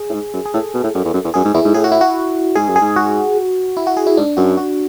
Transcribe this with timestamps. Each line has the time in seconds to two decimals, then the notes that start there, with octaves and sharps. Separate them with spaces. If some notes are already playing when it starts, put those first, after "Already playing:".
Already playing: G#4
0.09 A2
0.13 G#2
0.33 F#2
0.46 G#4
0.54 A2 A4
0.74 B2
0.84 A2
0.95 F#2
1.05 E2
1.14 F#2
1.24 E2
1.34 F#2 G#4
1.44 G#2
1.54 E2 E4
1.65 G#2
1.74 A2 G#4
1.84 F#4
1.92 E4
2.01 F#4
2.55 G#2 G#4
2.68 F#2
2.76 G#4
2.81 G#2
2.96 F#4
3.77 E4
3.87 F#4
3.97 G#4
4.07 E4
4.17 G#2 D4
4.37 F#2 F#4
4.57 F#4